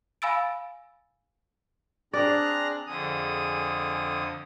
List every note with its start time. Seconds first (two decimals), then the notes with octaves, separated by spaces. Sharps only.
0.22 F5 G#5 B5 E6 A6 D7
2.13 C4 D4 G#4 D5 A#5 F6 F#6
2.87 F2 D3 G#4 D#6